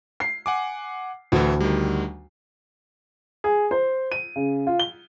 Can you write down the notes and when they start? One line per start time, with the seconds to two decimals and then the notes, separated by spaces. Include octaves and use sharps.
0.20 C7
0.46 F#5 G#5 D6
1.32 D2 A2 E3
1.61 D#3 G3
3.44 G#4
3.71 C5
4.12 D#7
4.36 C#3
4.67 F4
4.80 G7